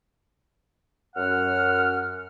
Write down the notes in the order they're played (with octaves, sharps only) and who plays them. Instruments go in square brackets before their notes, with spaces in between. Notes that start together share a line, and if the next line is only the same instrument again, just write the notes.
[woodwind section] F#2 F#5 F6